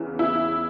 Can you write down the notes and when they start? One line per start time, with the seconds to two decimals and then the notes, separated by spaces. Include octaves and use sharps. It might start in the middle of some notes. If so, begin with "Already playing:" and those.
Already playing: E2 C#3 E3
0.19 E4